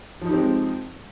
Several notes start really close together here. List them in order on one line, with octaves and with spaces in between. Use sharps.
F3 D#4 G4 C4 G#3